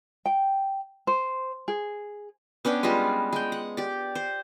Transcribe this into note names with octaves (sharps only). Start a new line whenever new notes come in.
G5
C5
G#4
B3 C#4 D4 G5
G3 G#3 F4 B4
G#3 G5
F#5
G4 D5
C5